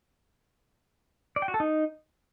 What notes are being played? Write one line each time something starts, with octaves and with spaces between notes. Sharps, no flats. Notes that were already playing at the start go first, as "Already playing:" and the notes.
D5
G5
F#4
A4
D#4